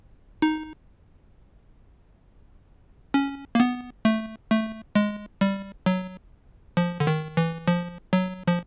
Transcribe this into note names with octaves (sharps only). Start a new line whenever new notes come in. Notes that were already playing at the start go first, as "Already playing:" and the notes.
D#4
C#4
A#3
B3
A3
A3
G#3
G3
F#3
F3
D3
D#3
E3
F3
F#3
F3